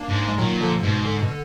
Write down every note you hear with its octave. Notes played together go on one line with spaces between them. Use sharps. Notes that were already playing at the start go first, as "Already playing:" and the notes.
Already playing: A#3 D4
G#2
G#3
A#2 D#3 F#3
D3 F3
D3
G#2 B2
D3
B2
D3